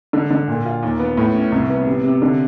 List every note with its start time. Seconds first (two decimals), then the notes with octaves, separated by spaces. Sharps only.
0.13 D3
0.31 D3
0.48 A#2
0.65 F4
0.83 D#2
1.00 B3
1.17 A2
1.35 C#4
1.52 C2
1.70 B3
1.87 C3
2.04 C3
2.22 D3